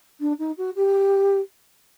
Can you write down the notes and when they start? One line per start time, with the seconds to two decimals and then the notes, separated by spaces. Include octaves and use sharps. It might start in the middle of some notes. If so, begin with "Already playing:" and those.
0.20 D4
0.39 D#4
0.58 F#4
0.76 G4